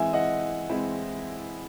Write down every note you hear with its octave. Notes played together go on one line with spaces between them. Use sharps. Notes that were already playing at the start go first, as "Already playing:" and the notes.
Already playing: E3 G#3 C4 E5 G#5
D#5 F#5
E3 G#3 C4 E4